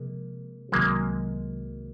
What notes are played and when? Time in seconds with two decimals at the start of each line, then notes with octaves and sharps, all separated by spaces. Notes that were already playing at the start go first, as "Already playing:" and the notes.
Already playing: C3 F3 G#3 A#3
0.72 C2 C3 D#3 F#3 G#3 A#3